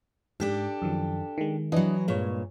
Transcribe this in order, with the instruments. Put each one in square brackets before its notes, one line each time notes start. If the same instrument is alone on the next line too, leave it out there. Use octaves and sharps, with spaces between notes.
[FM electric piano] G#2 [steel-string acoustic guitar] D4 G4 A4
[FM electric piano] F#2 D#3 F3
D#3 G#3
[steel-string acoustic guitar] E3 F#3 [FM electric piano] D4 E4 D#5
[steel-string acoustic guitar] G2 A#2 [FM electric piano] G#3 C#5